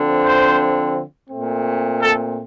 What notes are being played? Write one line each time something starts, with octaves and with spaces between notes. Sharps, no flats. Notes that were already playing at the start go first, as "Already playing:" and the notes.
Already playing: D3 F3 C4
C5
A#2 A3 C4
A4